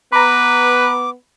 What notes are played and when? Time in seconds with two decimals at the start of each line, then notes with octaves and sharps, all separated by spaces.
0.13 B3 B4 A#5 B5 D6